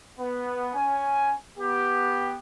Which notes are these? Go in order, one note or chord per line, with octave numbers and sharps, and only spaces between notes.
B3
C#4 G#5
B3 G4